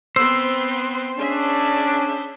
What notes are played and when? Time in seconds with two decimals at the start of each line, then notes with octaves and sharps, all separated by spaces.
0.16 B3 C4 C5 E6
1.18 C#4 D4 G#4 E5